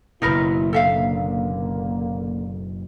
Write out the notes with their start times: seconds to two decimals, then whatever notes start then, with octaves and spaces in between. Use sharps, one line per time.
0.22 F#1 B2 D#4 E4 A#4 B4
0.73 D3 A#3 A4 E5 F5